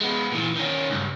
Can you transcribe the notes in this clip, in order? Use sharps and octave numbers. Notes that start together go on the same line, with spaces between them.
G#3 B3
A#2 E3
D#3 C#4
C#2 G2